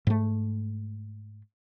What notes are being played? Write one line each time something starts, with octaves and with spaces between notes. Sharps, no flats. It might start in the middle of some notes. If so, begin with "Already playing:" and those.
G#2 A3